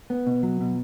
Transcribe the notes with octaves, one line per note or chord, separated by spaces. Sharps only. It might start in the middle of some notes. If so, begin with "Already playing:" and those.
B3
B2
F#3
B2